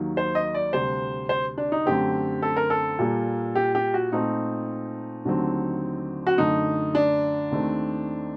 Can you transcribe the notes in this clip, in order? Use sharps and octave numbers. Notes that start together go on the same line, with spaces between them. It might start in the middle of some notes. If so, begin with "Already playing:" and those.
Already playing: D#2 D#3 F#3 A#3
C5
D#5
D5
D2 C3 G3 C5
C5
D4
D#4
F#2 D3 A3 C4 G4
A4
A#4
A4
A#2 G3 A#3
G4
G4
F#4
A#2 A3 C4 D#4
D#2 D3 F#3 A3 C4
F#4
F#2 D3 A3 D#4
D4
D#2 D#3 A3 C4